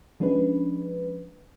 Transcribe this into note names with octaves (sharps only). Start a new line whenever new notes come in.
F3 G#3 C#4 D4 B4